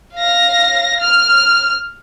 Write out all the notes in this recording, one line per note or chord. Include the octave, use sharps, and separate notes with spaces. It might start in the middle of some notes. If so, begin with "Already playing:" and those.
F5 A#6
F6